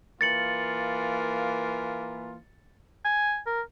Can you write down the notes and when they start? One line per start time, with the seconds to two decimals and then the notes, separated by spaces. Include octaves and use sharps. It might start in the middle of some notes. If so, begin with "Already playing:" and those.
0.21 E3 A#3 F4 A6 C#7 F#7
3.05 G#5
3.46 A#4